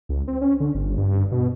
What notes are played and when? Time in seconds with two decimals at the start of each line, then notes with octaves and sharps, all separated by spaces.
0.09 C#2
0.28 C4
0.41 C#4
0.60 D3
0.75 G1
0.98 G2
1.32 B2